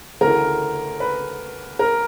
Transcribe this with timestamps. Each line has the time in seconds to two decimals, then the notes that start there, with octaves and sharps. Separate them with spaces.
0.21 D2 C#3 E3 A#4
1.00 B4
1.79 A#4